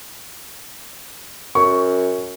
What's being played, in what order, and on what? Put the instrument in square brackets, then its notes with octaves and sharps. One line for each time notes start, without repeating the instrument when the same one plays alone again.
[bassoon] F#2 [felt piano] C#6